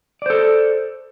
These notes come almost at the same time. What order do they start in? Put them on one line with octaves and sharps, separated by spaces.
D5 C5 A4